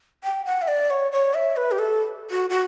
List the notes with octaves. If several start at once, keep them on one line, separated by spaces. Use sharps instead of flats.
G5
F#5
E5
D5
C#5
C#5
E5
B4
G4
A4
F#4
F#4